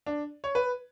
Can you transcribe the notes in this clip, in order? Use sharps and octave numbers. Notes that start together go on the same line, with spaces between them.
D4
C#5
B4